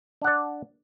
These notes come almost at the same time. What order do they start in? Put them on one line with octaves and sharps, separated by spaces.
D4 F#5 D5